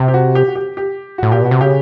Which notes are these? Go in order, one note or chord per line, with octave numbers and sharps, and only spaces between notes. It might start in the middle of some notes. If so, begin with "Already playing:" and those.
Already playing: C3
G4
F#4
G4
F#4
G4
G4
A2 F#4
A#2 G4
B2 F#4
C3
C#3 G4